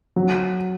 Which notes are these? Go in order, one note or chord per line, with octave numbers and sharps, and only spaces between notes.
F#3